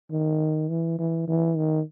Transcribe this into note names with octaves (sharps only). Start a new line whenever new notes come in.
D#3
E3
E3
E3
D#3